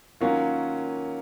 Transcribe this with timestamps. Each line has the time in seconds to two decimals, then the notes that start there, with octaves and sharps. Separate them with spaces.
0.21 D#3 F#3 A#3 C#4 F4